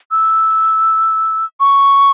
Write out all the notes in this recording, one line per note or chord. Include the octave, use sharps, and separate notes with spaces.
E6
C#6